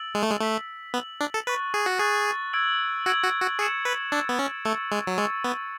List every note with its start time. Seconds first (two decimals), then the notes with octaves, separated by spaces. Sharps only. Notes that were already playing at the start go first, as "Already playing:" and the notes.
Already playing: E6 A6 D7 F#7
0.15 G#3
0.23 A3
0.31 G#3
0.41 A3 E6 B6 F#7
0.94 B3 E6 B6 F#7
1.21 D4
1.34 A4
1.47 B4 C#6 F#6 A6
1.74 G#4
1.86 F#4
1.99 G#4 C#6 F#6 A6
2.53 E6 G#6 D7 F#7
3.06 F#4 E6 G#6 D7 F#7
3.23 F#4
3.41 F#4
3.59 G#4 E6 A6 C#7 E7
3.85 B4
4.12 D4 E6 A6 C#7 E7
4.29 B3
4.39 C#4
4.65 A3 C#6 E6 A6 C#7
4.92 G#3
5.07 F#3
5.18 G#3 C#6 E6 A6 C#7
5.44 B3